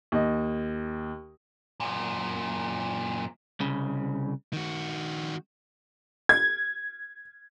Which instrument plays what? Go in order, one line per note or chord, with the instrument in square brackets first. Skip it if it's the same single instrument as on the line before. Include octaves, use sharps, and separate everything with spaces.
[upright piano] D#2 D#5
[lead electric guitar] F#2 A#2
C2 C#3
D#3 F#4
[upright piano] G#6